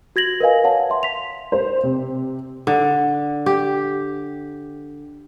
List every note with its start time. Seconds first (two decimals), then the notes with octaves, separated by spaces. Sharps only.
0.16 F#4 G#6 A#6 F#7
0.40 A#4 B4 D#5 F5 G#5
0.64 C#5 F5 F#5 A5
0.90 E5 C6
1.03 B6 F7
1.52 C5
1.83 C3
2.67 D3
3.46 G4